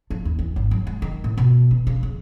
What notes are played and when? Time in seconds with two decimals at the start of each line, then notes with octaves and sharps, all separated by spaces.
0.10 F3
0.25 D#2
0.39 E3
0.56 G#1
0.71 F#3
0.87 G#3
1.02 D#3
1.24 A2
1.37 B2
1.71 D#3
1.87 C#3
2.03 F2